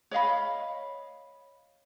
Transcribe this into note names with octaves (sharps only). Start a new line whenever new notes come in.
C#5 D#5 F5 B5